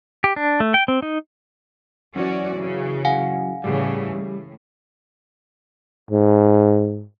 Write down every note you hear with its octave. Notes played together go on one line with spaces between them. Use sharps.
G4
D4
A3
G5
C4
D#4
F#2 E3 F#3 C#4 F#4 D5
C#3
F5 F#5 G#5
A2 C#3 E3 G3
A2
G#2